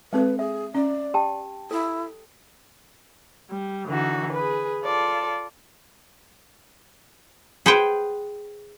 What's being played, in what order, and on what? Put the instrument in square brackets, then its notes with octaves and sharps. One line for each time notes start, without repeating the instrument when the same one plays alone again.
[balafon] G#3 C4 A4 [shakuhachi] B4
[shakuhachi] G#4 [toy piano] E5
[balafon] C#4 [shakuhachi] D5
[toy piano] G4 G5 A5
[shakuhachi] E4 [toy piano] A4
[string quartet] G3
D3 E3 D#4 F#4
G#4 B4
F4 A4 D5
[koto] G#4 B4 C5 F#5 G5